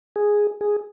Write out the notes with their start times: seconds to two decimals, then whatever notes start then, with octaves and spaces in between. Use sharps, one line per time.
0.16 G#4
0.61 G#4